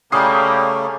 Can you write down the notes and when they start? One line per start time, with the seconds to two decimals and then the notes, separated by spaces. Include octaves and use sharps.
0.12 C#3 G3 A3 A#3 C#4 C#6 D#6 C7